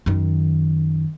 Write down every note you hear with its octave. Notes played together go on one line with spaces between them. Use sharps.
F#2 D#3